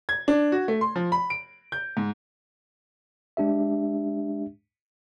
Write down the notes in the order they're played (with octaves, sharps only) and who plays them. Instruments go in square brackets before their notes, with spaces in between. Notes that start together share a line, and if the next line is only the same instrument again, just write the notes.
[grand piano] G#6
D4
F#4
A3
C6
F3
B5
D7
G6
G#2
[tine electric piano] G#3 D4 G4 E5